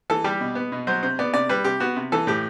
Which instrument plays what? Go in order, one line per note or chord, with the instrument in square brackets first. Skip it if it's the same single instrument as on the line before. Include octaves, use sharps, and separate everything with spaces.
[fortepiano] E3 A4
G3 G4
B2
B3
B2
F#3 C5
C3 C5
B3 D5
C3 D5
G3 B4
C3 G4
B3 F#4
C3
E3 A4
A2 G4